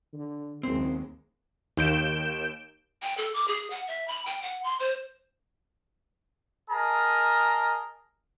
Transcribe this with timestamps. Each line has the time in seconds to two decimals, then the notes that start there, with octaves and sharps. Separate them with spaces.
0.13 D3
0.63 F#1 D#2 G#3 C4
1.77 D#2 G6 D7 E7
3.02 G5
3.17 A4
3.34 D6
3.48 G#4
3.70 F#5
3.87 E5
4.07 B5
4.26 G5
4.42 F#5
4.64 C6
4.80 C5
6.71 G#4 A#4 D#5 A5 A#5